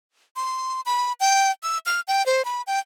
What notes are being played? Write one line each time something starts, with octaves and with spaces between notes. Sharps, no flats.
C6
B5
G5
E6
F6
G5
C5
B5
G5